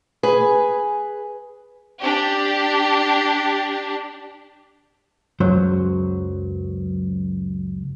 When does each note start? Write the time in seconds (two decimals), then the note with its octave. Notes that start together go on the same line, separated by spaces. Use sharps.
0.23 G#4 B4 G#5
2.01 D4 G4
5.40 C#2 F#2 F#3 C5